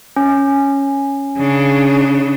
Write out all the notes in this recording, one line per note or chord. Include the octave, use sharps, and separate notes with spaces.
C#4
C#3 D4